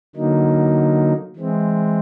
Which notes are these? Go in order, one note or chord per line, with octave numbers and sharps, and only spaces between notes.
D3 F#3 A#3 D#4
E3 G#3 C4